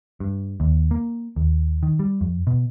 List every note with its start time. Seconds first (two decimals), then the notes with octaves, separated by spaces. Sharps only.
0.20 G2
0.60 D#2
0.91 A#3
1.36 D#2
1.83 D#3
1.99 G3
2.21 F2
2.47 B2